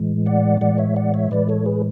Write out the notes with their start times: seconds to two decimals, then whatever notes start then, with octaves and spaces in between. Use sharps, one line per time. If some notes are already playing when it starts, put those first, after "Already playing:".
Already playing: A2 E3 G#3
0.26 D5 F#5
0.61 A2 E3 G#3 D5 F#5
0.78 C#5 E5
0.96 D5 F#5
1.14 C#5 E5
1.31 A2 E3 G#3 B4 D5
1.49 A4 C#5
1.66 G#4 B4